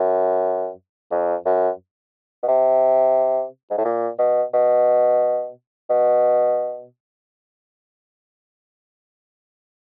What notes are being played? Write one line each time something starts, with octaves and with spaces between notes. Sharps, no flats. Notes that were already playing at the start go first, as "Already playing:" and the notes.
Already playing: F#2
F2
F#2
B2
C3
G#2
A2
A#2
B2
B2
B2